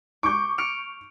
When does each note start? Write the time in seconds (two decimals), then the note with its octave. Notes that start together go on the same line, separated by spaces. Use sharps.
0.23 C#6 D6 G6
0.58 F6 C#7 D7